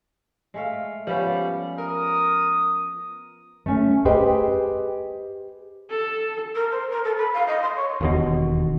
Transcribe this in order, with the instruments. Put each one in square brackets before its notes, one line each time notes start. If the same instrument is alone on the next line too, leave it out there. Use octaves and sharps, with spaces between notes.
[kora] G#3 A3 F5
[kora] F3 B3 C#4 [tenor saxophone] G3
[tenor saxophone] A#4 [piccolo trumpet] D#6
[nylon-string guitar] A3 C#4
G4 G#4 B4 C5 D#5 G5
[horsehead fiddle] A4
[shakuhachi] A#4
C5
A#4
A4
B5
F5
D#5
C6
C#5
[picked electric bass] E1 D#2 B2